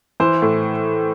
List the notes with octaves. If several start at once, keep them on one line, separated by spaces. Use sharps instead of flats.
E3 C5
A2